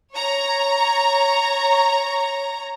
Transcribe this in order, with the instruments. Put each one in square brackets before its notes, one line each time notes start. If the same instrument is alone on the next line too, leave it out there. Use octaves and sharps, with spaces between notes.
[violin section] C#5 A#5